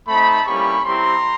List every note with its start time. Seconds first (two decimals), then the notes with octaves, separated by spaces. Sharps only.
0.08 A3 C4 D#4 A5 B5
0.46 G3 A#3 C#4 E4 G4 B5 C#6
0.85 G3 C4 E4 G4 A#5 C6